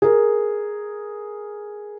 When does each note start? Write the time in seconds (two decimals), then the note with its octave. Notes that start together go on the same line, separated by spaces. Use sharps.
0.02 G#4 A#4